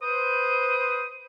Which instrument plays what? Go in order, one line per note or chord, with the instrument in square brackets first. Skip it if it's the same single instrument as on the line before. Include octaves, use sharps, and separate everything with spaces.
[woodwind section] B4 C5 D#6